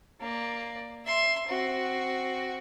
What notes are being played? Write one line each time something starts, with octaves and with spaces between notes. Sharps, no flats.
A#3 D5
E5 C6
C4 F#4